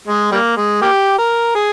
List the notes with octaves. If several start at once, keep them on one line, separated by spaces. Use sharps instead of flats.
G#3
G3 A#3
G#3
A#3 G4
A#4
G#4